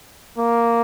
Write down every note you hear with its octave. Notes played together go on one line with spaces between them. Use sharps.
A#3